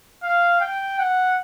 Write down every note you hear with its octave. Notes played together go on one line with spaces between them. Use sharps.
F5
G5
F#5